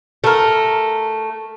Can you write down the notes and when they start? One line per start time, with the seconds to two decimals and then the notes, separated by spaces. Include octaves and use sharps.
0.24 A3 A#4